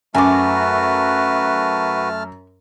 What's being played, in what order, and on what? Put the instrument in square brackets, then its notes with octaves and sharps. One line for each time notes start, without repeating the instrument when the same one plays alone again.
[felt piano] F#2 [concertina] A3 A5 F6 [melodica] F#4 B4 [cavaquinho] G#5 D6